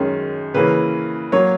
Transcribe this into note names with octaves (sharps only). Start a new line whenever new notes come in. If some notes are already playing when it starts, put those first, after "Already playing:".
Already playing: F#2 D#3 G#3 C#4
C#3 E3 A#3 C#4 B4
F#3 A#3 C#5